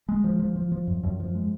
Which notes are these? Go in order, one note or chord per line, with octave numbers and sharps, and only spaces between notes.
G#3
F3
F3
F3
F3
F#2
F#2
F3
G#3